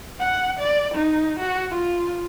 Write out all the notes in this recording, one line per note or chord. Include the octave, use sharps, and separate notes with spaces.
F#5
D5
D#4
F#4
F4